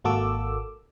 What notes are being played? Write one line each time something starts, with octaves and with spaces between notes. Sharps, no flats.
G#1 A#3 F#4 A4 D6 E6